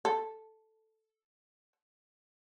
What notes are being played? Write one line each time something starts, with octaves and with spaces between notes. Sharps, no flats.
A4